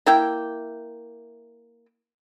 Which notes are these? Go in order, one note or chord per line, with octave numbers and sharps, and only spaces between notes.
A#3 E4 G5